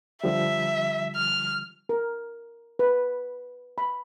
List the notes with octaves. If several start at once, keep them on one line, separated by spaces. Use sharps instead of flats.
D3 F3 G3 E5
F6
A#4
B4
B5